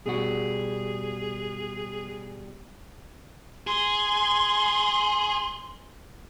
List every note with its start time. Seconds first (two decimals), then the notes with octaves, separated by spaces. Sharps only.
0.06 B2 G3 F#4 G#4
3.67 G#4 C6